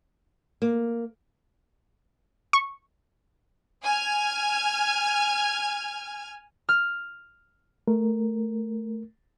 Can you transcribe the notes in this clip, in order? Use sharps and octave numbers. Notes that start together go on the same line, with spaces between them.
A#3
C#6
G#5 F6 G#6
F6
A3 A#4